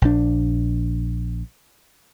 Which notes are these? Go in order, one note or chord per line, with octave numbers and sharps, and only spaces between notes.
A#1 D4